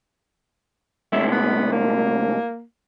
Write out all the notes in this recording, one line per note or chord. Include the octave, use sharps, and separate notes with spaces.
C2 A2 G#3 E5
B3
A#3